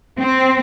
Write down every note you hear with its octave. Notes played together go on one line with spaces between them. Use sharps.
C4